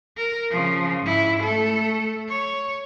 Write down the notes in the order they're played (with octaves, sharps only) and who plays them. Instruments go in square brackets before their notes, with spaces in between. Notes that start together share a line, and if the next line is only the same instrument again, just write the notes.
[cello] A#4
C#3 F3
G#2 E4
A3 A4
C#5